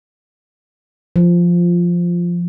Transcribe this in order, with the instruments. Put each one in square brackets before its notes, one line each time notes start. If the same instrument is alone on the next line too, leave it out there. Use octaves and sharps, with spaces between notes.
[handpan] F3